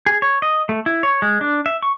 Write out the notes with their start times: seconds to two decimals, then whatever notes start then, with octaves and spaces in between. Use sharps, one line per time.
0.06 G#4
0.22 C#5
0.42 D#5
0.69 A3
0.86 E4
1.03 C#5
1.22 G#3
1.41 D4
1.66 E5
1.82 C#6